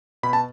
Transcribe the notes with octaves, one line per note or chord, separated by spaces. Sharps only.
B2 B5
A5